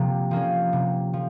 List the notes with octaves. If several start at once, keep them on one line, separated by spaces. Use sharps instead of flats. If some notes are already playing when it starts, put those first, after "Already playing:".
Already playing: C3 F3 A#3
F3 A#3 C#4
C3
F3